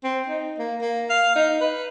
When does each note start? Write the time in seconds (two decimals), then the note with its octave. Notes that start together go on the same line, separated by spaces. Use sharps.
0.04 C4
0.28 D#4
0.59 A#3
0.81 A#3
1.09 F5
1.36 D#4
1.61 B4